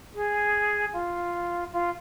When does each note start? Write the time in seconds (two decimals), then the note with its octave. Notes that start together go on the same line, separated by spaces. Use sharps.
0.14 G#4
0.93 F4
1.72 F4